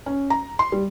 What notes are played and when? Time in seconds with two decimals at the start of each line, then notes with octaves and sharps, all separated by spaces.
0.06 C#4
0.30 A#5
0.59 C6
0.72 G3